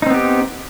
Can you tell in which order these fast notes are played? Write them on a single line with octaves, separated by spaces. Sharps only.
D#4 C4 B3 G4